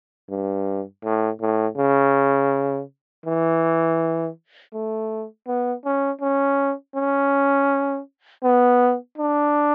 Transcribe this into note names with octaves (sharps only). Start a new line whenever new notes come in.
G2
A2
A2
C#3
E3
A3
B3
C#4
C#4
C#4
B3
D4